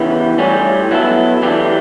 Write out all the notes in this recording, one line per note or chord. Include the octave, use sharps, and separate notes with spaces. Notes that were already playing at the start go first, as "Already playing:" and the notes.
Already playing: C#3 E3 B3 E4 G4
A2 G3 C#4 G4
F#3 B3 E4 A4
E3 A3 D4 G4